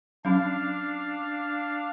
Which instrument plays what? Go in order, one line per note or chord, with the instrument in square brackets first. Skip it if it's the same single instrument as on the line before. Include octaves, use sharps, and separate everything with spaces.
[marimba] F#3 C#4 [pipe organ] D4 F5